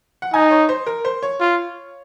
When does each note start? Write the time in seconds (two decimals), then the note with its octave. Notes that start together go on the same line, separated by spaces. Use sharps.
0.22 F#5
0.33 D#4 G#5
0.51 C#5
0.69 C5
0.87 A#4
1.05 C5
1.23 C#5
1.40 F4